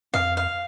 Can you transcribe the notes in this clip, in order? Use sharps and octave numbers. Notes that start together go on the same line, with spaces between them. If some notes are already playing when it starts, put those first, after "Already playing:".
F2 F5
F5